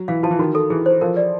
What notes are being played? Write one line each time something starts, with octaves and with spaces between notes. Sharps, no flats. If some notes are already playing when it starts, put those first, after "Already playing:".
Already playing: F#3
E3 F5
F3 A5
E3
D#3 F#4
A4
E3 G#4
C5
F3 A#4
D5